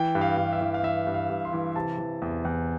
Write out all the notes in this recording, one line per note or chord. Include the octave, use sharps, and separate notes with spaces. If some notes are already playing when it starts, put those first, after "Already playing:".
Already playing: E3 G5
G2
F5
G2
E5
E3
F5
E3 E5
G2
F5
G2
C6
E3
C3 A5
E3
E2
E2